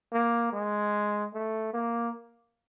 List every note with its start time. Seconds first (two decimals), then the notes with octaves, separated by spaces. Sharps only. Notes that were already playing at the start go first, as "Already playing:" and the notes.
0.13 A#3
0.53 G#3
1.34 A3
1.74 A#3